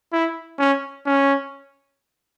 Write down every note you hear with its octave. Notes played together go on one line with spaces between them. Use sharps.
E4
C#4
C#4